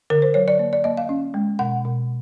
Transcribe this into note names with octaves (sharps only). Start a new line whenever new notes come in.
D3 A#4
C5
F#3 C#5
D5
A#3
D5
A#3 D#5
F5
C#4
G#3
B2 F#5
B2